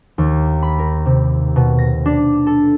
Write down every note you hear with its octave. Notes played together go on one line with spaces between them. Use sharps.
D#2
B5
A#4
C3
B2
A#6
D4
A4